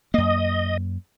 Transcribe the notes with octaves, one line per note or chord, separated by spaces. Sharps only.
F#2 A#3 D#5